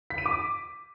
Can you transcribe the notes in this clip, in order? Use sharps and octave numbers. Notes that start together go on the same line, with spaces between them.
B6
D#7
D6